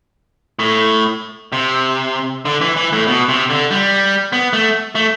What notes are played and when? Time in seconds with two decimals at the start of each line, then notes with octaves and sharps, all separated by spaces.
0.59 A2
1.52 C3
2.45 D3
2.61 E3
2.77 E3
2.93 A2
3.08 B2
3.29 C3
3.50 D3
3.71 G3
4.33 B3
4.53 A3
4.95 A3